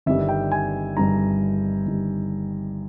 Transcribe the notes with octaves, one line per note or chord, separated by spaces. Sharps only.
G1 G2 D#3 G3 E5
G5
G#5
G1 G2 D#3 G3 A#5
G1 G2 D#3 G3